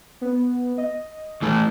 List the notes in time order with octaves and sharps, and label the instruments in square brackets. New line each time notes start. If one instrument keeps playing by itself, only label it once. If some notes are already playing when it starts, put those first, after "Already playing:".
[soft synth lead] B3
D#5
[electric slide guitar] E3 A3 A4